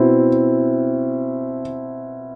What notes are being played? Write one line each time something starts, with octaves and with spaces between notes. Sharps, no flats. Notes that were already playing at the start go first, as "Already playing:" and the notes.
Already playing: B2 C4 E4